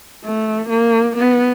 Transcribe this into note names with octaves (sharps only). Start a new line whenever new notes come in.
A3
A#3
B3